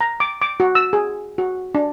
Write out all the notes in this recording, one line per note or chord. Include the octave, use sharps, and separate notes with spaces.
A#5
D6
D6
F#4
E6
G#4
F#4
D4